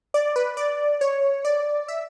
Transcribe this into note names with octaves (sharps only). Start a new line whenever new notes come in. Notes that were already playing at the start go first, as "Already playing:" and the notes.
D5
B4
D5
C#5
D5
E5